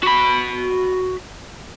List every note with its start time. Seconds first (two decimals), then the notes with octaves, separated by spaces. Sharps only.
0.03 F#4 B5